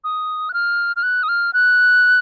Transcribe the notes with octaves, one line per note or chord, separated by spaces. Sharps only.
D#6
F#6
F6
F6
F#6
D#6
F6
F#6